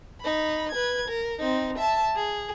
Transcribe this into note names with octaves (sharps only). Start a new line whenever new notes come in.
D#4 B5
B4 G#6
A#4
C4 D#4
E5 A5
G#4